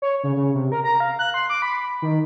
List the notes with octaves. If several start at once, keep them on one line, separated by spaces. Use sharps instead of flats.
C#5
C#3
C#3
C3
A#4
A#5
F5
F#6
C6
D6
B5
D#3